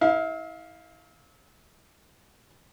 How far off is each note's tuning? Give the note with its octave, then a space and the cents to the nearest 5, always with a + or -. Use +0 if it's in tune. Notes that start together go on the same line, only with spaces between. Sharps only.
E4 -35 F5 +5